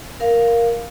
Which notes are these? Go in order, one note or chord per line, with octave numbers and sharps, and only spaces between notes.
A#4 F5